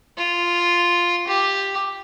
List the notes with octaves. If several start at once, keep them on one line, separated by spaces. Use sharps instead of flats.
F4
G4